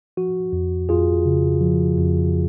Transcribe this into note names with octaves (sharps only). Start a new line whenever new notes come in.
F3 F#4
F2
F2 F4 G#4
C#3
F3
F2